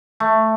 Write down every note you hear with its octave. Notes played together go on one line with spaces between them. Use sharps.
A3